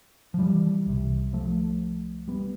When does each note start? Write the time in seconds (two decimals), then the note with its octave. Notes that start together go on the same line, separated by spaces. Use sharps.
0.34 F3
0.38 E3 G3
0.87 C2 C3
1.33 F3 A3
2.28 G3 B3